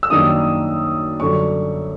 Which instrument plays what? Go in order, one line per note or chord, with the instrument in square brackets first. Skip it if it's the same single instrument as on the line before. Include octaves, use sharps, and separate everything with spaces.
[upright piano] E6
F#2 D#3 G3 A#3 D4 D#6
F#2 D3 G3 C#6